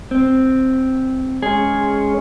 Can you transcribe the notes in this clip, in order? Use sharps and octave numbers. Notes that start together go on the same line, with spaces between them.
C4
G#3 C#4 G#4